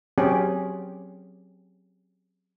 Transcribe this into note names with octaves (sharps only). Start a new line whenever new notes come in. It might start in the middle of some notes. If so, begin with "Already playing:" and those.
F#3 C4 C#4 G4 G#4